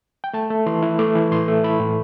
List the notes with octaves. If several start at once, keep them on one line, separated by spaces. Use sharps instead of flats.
G5
A3 A5
A3
E3 C6
E4
A3 D6
E3
A2 C6
A3
E4 B5
A2